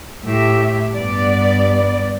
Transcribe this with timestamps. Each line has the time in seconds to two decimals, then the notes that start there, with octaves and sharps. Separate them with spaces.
0.25 A2 G4 E5
0.94 G2 B3 D5